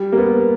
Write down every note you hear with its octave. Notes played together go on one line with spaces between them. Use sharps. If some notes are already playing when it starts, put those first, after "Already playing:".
Already playing: G3
A#3
B3